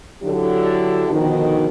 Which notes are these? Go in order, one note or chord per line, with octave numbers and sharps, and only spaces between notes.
D3 F#3 D4 E4 G4 A4
F2 B2 D3 D#3